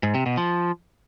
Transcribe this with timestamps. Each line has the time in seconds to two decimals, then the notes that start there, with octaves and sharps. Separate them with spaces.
0.03 G#2
0.14 C3
0.26 B2
0.37 F3